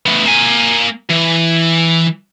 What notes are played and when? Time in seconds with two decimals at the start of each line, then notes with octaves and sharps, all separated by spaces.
0.06 A3 B3
0.26 A#3 G#5
1.10 E3